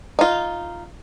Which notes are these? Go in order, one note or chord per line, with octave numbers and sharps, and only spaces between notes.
D#4 F4